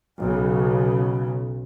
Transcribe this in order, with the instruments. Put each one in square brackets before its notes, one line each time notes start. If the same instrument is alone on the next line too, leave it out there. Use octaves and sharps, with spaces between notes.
[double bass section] B1 C#3